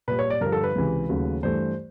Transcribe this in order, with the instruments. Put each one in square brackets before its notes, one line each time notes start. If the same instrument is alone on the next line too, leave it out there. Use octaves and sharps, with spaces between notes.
[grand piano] A#2 G3 B4
C#5
D5
G2 D3 F3 A#4
A4
B4
C#2 C3 E3
D#2 C#3 F#3 A3
G2 E3 A3 C5